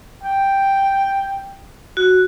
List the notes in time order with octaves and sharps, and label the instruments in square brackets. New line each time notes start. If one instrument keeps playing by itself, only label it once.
[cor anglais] G5
[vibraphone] F#4